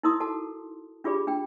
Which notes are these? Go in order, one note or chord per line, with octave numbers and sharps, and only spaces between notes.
D#4 E4 A#4 C6 D#6
F#4 A4 A5
D4 F4 G4 G#4 D5 B5
D4 G5